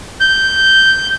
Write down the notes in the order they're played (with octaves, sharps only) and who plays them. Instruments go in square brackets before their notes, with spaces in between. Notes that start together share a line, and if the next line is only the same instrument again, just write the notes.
[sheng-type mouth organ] G6